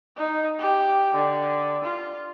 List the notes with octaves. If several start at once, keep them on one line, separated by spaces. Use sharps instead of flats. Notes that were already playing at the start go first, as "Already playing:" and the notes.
D#4
G4
D3
F4